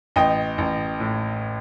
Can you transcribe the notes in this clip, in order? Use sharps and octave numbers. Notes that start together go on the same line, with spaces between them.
A1 D#5 G5
A1
A2